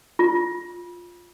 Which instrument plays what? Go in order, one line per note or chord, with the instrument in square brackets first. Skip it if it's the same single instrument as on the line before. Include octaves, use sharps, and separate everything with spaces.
[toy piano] F4